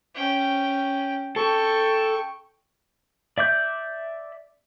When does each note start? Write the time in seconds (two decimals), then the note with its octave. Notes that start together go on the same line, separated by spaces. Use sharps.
0.15 C#4 G5
1.36 A4 G5 C#6
3.38 D5 E5 D6 G6